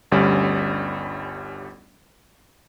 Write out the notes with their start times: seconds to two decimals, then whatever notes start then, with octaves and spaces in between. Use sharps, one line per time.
0.12 G1 D2 G3 C#4 D5